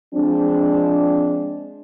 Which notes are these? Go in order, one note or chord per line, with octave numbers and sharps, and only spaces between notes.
F3 G#3 C4 D4